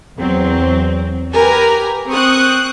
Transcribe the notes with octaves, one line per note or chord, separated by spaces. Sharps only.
E2 F#3 C4
G4 A#4 B4 G#5 A#5
C4 C#6 D#6 F#6